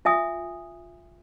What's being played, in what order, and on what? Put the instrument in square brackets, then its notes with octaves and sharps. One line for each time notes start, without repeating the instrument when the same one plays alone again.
[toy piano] F4 E5 G#5 D#6